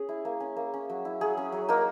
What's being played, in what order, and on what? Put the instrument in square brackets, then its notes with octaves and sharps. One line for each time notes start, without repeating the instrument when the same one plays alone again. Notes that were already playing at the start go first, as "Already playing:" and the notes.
Already playing: [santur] C#4 G#4
E4
A#3
C#4
A#3
C#4
F#3
E4
F#3 G#4
C#4
F#3
A#3 D#4 A#4